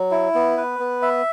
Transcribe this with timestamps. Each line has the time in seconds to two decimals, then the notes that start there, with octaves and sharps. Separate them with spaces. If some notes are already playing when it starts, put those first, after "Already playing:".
Already playing: F#3
0.11 E4
0.34 B3
0.57 B4
0.79 B3
1.02 E5